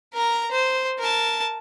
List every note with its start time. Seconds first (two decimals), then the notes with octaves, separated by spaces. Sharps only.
0.13 A#4 A#5
0.51 C5
0.99 A#4 A5